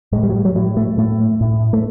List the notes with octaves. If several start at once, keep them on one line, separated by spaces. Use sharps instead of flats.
A2 G#3
G3
F#3
G3
F#3
A2 F#3
A3
A2 A3
A2
A3